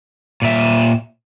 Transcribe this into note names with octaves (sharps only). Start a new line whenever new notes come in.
A#2 E5